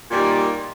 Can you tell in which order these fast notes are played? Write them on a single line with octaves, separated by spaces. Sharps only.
A#2 G3 D#3